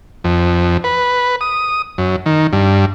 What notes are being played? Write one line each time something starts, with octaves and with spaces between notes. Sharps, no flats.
F2
B4
D#6
F#2
D#3
G2